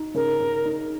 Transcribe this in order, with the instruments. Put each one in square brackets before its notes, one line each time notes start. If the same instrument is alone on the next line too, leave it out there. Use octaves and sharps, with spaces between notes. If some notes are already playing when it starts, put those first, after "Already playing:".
Already playing: [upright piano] D#4
[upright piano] C#3 [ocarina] A#4
[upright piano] C#3
D#4